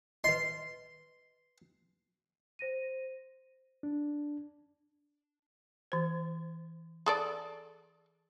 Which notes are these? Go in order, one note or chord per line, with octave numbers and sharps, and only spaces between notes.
B4 D#5 C6
C5 A#6 D#7
D4
E3 C5
G#4 A4 D5